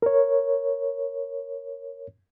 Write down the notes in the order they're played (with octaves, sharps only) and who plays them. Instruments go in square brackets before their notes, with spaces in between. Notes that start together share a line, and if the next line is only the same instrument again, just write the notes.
[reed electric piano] A#4 C#5